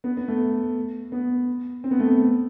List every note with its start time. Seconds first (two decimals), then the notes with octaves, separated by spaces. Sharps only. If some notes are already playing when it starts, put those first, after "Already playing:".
0.04 B3
0.17 B3
0.28 A3
1.12 B3
1.84 C4
1.91 B3
1.99 A3
2.07 B3